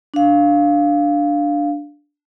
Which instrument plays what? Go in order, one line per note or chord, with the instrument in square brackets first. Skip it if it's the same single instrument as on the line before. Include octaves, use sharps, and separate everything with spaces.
[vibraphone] D4 F5